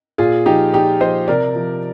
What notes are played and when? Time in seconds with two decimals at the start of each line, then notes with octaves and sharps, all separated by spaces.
0.18 A#2 F4 G#4
0.46 F3 D#4 G4
0.74 A#2 D#4 G4
1.01 F3 C5 D#5
1.28 C3 A#4 D5
1.55 F3